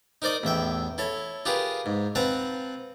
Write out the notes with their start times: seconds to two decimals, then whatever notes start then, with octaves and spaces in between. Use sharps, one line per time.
0.22 D#4 A#4 C5 D5 D#5
0.43 A1 E2 E5 G5
0.98 E4 A4 C#5 A5
1.45 F4 G4 G#4 A#4 B4
1.86 G#2
2.15 C4 B4 F5 F#5 A5 A#5